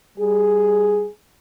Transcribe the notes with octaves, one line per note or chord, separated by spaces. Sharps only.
G3 G#4